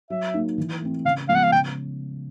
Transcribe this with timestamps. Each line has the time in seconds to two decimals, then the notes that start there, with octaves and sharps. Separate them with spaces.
0.10 F#3 E5
0.34 A#3 D#4
0.58 E3
0.81 A3 C4
1.05 C#3 F5
1.29 F3 G#3 B3 F5
1.35 F#5
1.43 F5
1.52 C#3 G5